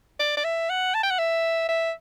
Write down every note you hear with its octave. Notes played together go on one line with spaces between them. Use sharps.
D5
D5
E5
F#5
A5
G5
F#5
E5
E5